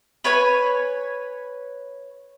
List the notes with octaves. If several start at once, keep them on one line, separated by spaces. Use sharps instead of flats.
B4 C#5 G#5 B5